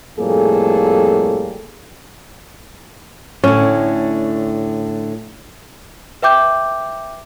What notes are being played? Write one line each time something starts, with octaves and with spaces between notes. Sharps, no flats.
F2 A2 G3 A#3 G#4 A4
A2 D3 C#4
B4 E5 G5 D6 G6